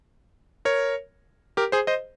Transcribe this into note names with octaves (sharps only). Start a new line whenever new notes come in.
A#4 C#5
G4 A#4
G#4 C5
C5 D#5